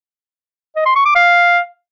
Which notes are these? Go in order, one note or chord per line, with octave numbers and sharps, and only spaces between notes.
D#5
C6
C#6
D6
F5